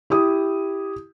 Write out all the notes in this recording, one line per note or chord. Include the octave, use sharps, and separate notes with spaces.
E4 G4 D#6